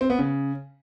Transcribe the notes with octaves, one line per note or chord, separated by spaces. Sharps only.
C4
B3
C#3